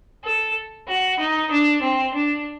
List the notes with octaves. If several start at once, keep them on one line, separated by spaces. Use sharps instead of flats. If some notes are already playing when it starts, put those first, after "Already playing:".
A4
F#4
D#4
D4
C4
D4